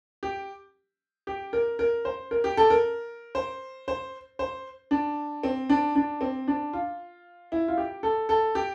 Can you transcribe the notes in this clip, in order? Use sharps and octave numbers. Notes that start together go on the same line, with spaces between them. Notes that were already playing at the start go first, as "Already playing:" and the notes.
G4
G4
A#4
A#4
C5
A#4
G4
A4
A#4
C5
C5
C5
D4
C4
D4
D4
C4
D4
F4
E4
F4
G4
A4
A4
G4